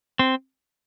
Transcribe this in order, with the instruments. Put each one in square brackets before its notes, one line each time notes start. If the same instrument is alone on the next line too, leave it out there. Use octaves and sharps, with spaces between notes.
[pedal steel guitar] C4